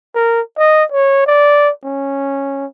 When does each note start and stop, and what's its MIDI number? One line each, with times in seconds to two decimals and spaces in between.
0.15 0.41 70
0.58 0.84 75
0.92 1.26 73
1.26 1.71 74
1.84 2.66 61